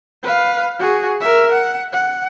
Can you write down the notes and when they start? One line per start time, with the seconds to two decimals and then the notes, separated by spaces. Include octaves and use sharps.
0.23 B4 F5
0.80 F#4 G#4
1.21 A#4 E5
1.52 F#5
1.93 F#5